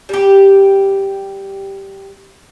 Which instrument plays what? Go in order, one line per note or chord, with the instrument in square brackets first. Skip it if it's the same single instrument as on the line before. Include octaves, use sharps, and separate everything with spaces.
[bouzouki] G3 G4